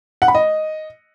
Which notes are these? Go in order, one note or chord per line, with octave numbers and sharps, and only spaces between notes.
F#5
B5
D#5